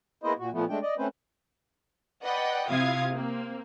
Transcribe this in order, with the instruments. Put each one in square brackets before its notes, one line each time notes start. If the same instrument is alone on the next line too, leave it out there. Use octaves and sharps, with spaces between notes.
[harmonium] G#3 A#3 B3 E4 C5 D#5
A#2 F#4
A#2 F3 A3 B3
G#3 A3 D4 G5
D5 D#5
A3 C4 C#4 B4 C5
[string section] B4 D5 D#5 F#5 G5
C3 E4 F4 F5 D#6 G#6
A#3 C4